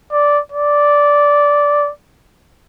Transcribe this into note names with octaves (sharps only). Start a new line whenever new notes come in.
D5
D5